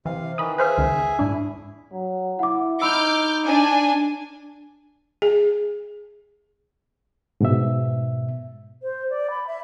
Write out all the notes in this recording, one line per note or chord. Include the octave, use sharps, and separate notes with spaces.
C3 E3 F5
D#3 E3 B5 D#6
G#4 B4 C5 E5 F5 G#5
C#2 D#3
G#2 D4 E4
F#3
E4 F#5 D6
D#4 D#5 B5 D6 E6 F6 G6
D4 G#5
G#4
G#2 B2 E5
C5
D5
B5
E5